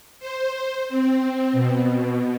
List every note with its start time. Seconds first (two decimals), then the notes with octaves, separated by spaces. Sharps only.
0.19 C5
0.89 C4
1.53 B2